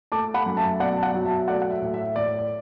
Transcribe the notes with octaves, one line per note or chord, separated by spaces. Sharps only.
A3 A5 D6
F#5 B5
F#2
E5 A5
B2 D5 F#5
A5
D5 F#5
F#3
E5 A5
A3 D5 F#5
F#5
E5
A2
E5
A2 D5
D5